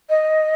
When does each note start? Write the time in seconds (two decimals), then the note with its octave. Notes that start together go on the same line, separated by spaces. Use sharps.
0.10 D#5